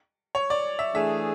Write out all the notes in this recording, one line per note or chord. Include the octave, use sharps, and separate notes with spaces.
C#5
D5
E5
E3 A3 D4 G#4 E5